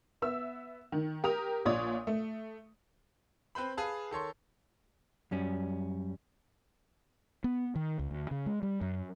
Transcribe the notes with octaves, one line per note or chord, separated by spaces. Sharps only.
B3 E5 E6
D#3
G4 A#4 D#6 F7
A#1 A#2 C#5 D5 D#6
A3
C4 B4 C5 B5
G#4 B4 F5 A5
D#3 A4 C#5 C6
F#2 G3 C#4
B3
D#3
C#2
D2
C#3
G#3
G3
F#2